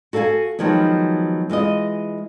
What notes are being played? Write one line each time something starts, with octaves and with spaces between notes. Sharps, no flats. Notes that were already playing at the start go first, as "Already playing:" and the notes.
F#4 A4 F5 F#5 G#5
D#3 F3 F#3 G#3 B3
E3 G#3 F4 D#5